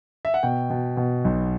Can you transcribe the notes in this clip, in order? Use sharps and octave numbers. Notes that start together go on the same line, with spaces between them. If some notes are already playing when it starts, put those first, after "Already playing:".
E5
F#5
B2 G5
B2
B2
B1